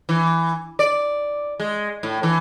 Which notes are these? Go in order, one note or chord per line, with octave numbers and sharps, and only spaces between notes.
E3
D5
G#3
A2
E3